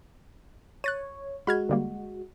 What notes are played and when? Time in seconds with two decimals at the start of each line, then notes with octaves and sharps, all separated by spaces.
0.84 C#5 F#6 A6 D#7
1.47 G#3 F#4 B5 F6 G#6
1.69 D3 G3 A#3